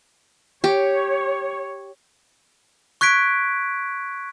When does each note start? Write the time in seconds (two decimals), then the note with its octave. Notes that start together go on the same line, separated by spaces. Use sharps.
0.64 G4 C#5
3.01 C#6 F#6 G#6 B6 D7